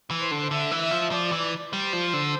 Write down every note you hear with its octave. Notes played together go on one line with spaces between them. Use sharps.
E3
C5
D3
D3 E5
E3
E5
F3
F3 D5
E3
G3 C5
F3
D3